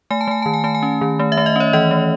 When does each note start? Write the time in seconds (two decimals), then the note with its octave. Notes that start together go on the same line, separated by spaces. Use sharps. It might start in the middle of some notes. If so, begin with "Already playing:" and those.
0.11 A3 G#5
0.21 A5
0.27 A3 G#5
0.42 D#3 A5
0.54 G#5
0.64 A3 A5
0.75 G#5
0.83 C#4
1.01 D#3
1.19 A3
1.32 E5
1.37 A3
1.46 D#5
1.56 C#4 C#5
1.73 E3 D#5
1.91 A3